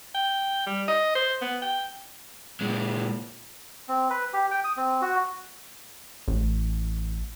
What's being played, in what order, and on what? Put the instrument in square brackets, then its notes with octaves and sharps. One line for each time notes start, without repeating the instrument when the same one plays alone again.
[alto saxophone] G5
G3
D#5
C5
B3
G5
[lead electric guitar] A#2 G#3
[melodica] C4
B4
G4
G5
D#6
C4
F#4
[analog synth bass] A1